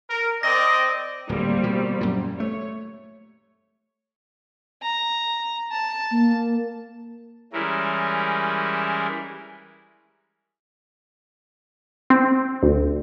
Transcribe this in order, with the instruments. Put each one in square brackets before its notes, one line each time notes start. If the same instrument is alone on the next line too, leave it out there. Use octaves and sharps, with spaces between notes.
[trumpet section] A#4
[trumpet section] C4 D5 D#5 [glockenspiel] A#6
[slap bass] D1 [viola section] G3 A#3 C4
[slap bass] B2 F3
F#2 A#2
[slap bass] A3 [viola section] C#5
[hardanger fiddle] A#5
A5
[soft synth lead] A#3
[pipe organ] E3 G3 G#3 C#4 E4 A#4
[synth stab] C4
D2